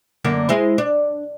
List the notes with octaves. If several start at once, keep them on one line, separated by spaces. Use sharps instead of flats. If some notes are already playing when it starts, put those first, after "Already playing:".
F#2 D3 A#3
G#3 E4 C5
D4